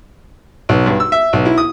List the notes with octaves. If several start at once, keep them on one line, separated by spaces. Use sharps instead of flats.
B1
G2
E6
E5
B1
E4
D#6